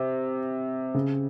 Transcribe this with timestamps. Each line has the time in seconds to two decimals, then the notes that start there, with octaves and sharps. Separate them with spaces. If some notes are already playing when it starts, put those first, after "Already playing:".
Already playing: C3
0.94 C#3